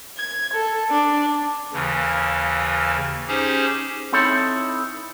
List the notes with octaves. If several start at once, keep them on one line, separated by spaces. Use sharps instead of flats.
G#6
A4
D4
D#2 C#3 E3
C#4 D#4 G4 G#4 C5
C4 D#4 E4 A4 C#5